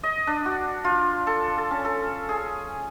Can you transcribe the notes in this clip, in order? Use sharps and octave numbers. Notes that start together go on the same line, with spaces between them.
D#5
D4
F#4
F4
A4
A4
C#4
A4
G#4